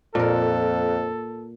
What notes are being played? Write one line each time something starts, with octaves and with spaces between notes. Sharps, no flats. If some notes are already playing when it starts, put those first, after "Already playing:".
F2 A#2 A4 A#4